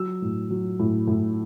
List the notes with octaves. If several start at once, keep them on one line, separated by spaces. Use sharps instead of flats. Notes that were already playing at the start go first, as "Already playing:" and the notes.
Already playing: F#3 E6
A2
F#3
A2
A2